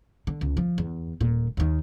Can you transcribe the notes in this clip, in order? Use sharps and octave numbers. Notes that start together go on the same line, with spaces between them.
D3
C#2
F3
E2
D#1 A#2
D#2 D#3